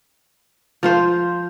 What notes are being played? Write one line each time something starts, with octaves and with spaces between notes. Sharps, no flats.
F3 F4 C5